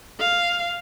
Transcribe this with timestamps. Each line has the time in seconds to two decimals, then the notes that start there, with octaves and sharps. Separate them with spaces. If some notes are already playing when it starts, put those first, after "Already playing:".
0.19 F5